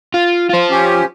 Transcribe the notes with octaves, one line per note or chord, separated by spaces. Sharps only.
F4
F4 C5
C#4 G4